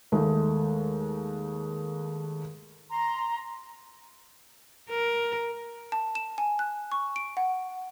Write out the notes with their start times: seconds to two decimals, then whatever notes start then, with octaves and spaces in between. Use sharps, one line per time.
0.12 D#2 G#3 A3
2.91 A#5 C6
4.90 A#4
5.92 A5
6.15 E7
6.38 G#5
6.59 F#6
6.92 C#6
7.16 D7
7.37 F#5